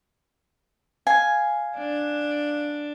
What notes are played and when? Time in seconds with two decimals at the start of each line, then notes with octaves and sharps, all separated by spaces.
1.07 F5 G#5 G#6
1.78 D4